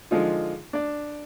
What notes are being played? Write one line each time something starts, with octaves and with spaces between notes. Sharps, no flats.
D3 F3 G#3 D#4 F4
D4 D5